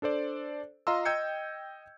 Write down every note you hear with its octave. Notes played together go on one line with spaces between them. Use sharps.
D4 A4 C5 D5
F4 D#5 F5 A#5 C6 E6
D#5 G5 E6 G6 G#6 C#7